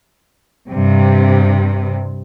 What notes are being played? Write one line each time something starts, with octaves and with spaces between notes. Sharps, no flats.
G2 C3